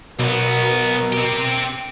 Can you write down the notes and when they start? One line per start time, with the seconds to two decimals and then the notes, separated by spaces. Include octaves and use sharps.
0.19 B1 B2 B3 A#4
1.12 C4 G4